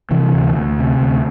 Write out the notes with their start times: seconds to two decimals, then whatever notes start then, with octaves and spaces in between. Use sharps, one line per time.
0.11 C3 E3
0.33 D2
0.56 D2
0.79 C3
1.02 D2